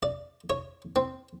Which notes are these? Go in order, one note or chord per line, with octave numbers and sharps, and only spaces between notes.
D5
C#5
C4